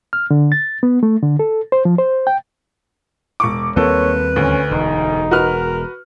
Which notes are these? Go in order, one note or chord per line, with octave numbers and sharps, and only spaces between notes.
F6
D3
A6
B3
A3
D3
A4
C5
F3
C5
G5
E1 C#6 D6
D#2 G3 A#3 C4 A4 B4 C#5
D2 C#4
E1 D#4
F#4 A#4 B4 F6